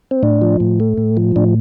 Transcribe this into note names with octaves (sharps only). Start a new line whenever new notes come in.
C4
A2 D4
F3
A2
A3
A2
F3
A2 D4